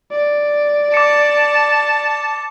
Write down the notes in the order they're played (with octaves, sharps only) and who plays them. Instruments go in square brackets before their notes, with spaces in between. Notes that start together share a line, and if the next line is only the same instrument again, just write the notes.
[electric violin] D5
[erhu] A5 [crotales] D6 C#7